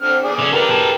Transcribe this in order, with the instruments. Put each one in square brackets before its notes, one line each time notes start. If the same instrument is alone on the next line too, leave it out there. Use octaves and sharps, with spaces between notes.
[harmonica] D3 C4 F6
G#4 D5
[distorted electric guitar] D3 C#4
[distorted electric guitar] D3 D4 [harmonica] G4 A#4 B4
[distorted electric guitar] G#4 A5